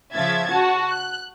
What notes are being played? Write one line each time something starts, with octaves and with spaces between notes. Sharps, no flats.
C#3 F3 E5 G#6 A6
F#4 A5
F#6